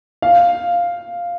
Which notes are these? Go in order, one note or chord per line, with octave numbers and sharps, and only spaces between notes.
F5